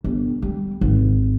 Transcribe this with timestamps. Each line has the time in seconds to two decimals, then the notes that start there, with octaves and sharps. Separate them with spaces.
0.04 G1
0.42 G3
0.81 G#1